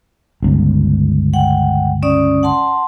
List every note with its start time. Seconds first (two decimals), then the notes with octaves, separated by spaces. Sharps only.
0.43 G1 C#2
1.34 F#5 G5
2.02 C#4 D5 D#6
2.43 F#5 A5 C6